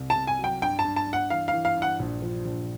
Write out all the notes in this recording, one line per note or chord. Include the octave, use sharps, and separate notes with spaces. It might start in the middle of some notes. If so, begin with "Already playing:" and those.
Already playing: C2
A5
C2
G#5
F#3
G5
G2 G5
A5
G2
A5
G2
F#5
E3 F5
F5
E3
F5
G2
F#5
A#1
F3
A#1